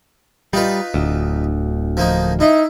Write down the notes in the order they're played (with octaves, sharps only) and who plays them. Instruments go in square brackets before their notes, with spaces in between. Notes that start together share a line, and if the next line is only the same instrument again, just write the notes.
[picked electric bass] G3 [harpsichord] D#4 F4 B4
[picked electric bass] D1 D2
[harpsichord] F3 A#3 D#4
[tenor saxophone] D#4 [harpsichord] E4